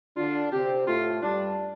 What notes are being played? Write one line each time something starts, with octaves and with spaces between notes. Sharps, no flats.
D3 D4 F4
C3 C4 G4
A2 A3 F4
G2 G3 D4